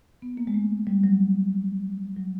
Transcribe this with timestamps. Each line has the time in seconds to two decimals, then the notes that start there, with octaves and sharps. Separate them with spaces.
0.22 B3
0.37 A#3
0.47 G#3
0.54 A3
0.87 G3
1.04 F#3
2.17 F#3